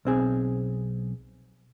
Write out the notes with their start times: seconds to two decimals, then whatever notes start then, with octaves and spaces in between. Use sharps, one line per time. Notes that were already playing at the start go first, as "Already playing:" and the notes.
0.05 B1 C4 G#4